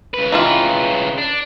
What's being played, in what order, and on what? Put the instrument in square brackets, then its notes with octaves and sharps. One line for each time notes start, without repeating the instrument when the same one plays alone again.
[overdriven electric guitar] C#3 B4
[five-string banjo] D#3 E3 F4
[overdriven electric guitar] D4